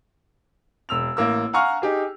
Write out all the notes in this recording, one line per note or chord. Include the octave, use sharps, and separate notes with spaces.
E1 E6 F7
A1 A#3 E6
F5 F#5 G#5 A#5 C#6 F6
D#4 G4 G#4